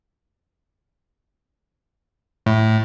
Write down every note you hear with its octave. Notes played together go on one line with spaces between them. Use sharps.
A2